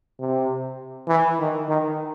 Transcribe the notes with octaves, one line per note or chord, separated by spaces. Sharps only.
C3
E3
D#3
D#3